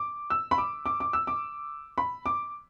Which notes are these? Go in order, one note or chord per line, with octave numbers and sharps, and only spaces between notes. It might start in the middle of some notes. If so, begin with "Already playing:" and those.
Already playing: D6
E6
B5
D6
D6
D6
E6
D6
B5
D6